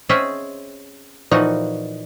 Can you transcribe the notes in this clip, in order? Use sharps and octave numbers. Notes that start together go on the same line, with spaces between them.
C4 C#4 G#4 D#5 E5 F#5
A#2 E3 F3 D#4 F#4 F#5